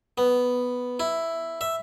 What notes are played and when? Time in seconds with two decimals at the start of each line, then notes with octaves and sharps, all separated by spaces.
0.18 B3
1.00 E4
1.61 E5